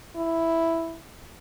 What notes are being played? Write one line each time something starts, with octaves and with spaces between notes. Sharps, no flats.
E4